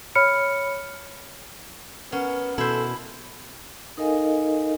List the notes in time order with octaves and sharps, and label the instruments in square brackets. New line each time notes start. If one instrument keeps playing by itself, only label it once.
[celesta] C#5 B5 F6 C#7
[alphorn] B3 [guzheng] C#4 [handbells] A#4 F#5
[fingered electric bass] B2 [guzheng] E4 C5 [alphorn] A4
[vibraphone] D#4 A4 A#4 D#5 F5 G#5